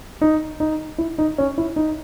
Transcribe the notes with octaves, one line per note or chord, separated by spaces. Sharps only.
D#4
D#4
E4
D#4
C#4
E4
D#4